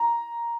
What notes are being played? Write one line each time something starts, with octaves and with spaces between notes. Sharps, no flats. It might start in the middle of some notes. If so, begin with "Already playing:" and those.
Already playing: A#5